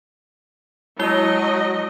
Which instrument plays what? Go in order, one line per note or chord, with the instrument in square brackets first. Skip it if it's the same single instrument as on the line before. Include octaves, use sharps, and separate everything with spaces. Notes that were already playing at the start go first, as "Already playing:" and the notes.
[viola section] F#3 D#5 [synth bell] G#3 E4 G7